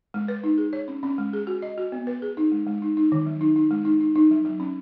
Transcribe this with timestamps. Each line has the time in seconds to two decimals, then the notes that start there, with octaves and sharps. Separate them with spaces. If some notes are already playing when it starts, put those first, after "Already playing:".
0.14 G#3
0.28 B4
0.44 D#4
0.58 G#4
0.73 C#5
0.88 C#4
1.03 C#4
1.18 G#3
1.33 G#4
1.47 F#4
1.62 D#5
1.78 F#4
1.92 B3
2.07 B4
2.22 G#4
2.37 D#4
2.52 G#3
2.66 G#3
2.82 D#4
2.97 D#4
3.12 D#3
3.26 F#3
3.41 D#4
3.56 D#4
3.71 G#3
3.85 D#4
4.00 D#4
4.16 D#4
4.31 F#3
4.45 F#3
4.60 C#4